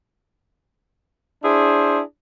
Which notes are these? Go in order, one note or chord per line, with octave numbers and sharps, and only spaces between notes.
D4 E4 G#4 C5